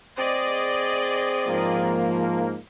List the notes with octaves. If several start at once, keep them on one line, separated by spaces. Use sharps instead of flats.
C4 G#4 D5 D#5
G#2 F3 A#3